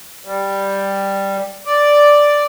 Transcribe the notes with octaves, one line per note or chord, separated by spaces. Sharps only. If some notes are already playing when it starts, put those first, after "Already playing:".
G3
D5